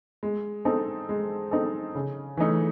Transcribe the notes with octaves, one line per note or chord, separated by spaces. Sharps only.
G#3
C4 D#4 A4
G#3
C4 D#4 A4
C#3
E3 A3 D#4